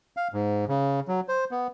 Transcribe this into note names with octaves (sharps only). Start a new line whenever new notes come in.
F5
G#2
C#3
F#3
C5
B3